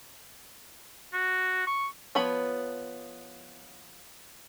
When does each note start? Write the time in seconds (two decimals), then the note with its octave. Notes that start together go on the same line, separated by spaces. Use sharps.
1.13 F#4
1.67 C#6
2.15 F3 B3 C#5 B5